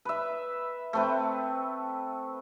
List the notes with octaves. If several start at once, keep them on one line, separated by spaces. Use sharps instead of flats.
B4 E5
A3 C4 B4